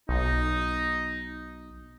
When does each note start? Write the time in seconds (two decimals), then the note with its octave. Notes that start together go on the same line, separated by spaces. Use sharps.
0.09 B1 D#4